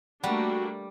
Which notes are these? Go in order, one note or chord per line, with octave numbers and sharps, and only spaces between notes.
G3 A3 A#3 D4 F#4